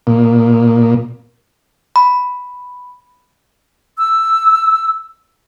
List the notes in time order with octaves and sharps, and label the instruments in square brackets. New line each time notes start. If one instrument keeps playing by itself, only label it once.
[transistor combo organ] A#2
[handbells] B5
[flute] E6